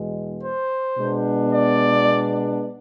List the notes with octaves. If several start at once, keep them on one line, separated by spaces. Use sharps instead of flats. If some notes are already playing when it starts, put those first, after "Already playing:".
Already playing: E2 B2 G#3
C5
B2 G#3 B3 D4
D5